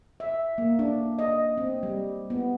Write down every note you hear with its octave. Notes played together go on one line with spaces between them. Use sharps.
E5
A#3
D4
D#5
C4
G3
B3